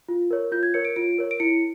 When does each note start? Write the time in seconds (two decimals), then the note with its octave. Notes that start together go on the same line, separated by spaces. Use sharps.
0.08 F4
0.31 A#4 C#5
0.52 F4 G6
0.63 G#6
0.74 A#4 C#5 C#7
0.85 D7
0.96 F4 D7
1.18 A#4 C#5
1.31 D7
1.40 E4 C#7